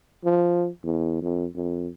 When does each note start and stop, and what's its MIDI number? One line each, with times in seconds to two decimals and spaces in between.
0.25 0.68 53
0.84 1.18 40
1.22 1.46 41
1.56 1.88 41